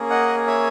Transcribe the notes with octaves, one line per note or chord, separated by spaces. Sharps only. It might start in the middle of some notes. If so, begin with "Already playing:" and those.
Already playing: A#3 C#4 G#4
D#5 F#5
C#5 E5